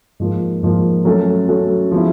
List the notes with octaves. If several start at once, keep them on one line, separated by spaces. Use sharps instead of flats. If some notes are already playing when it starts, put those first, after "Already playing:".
G#2 F3 A#3
G#2 F3 A#3
F#3 A3 C#4 F#4 A4
F#3 A3 C#4 F#4 A4
F3 G#3 B3 E4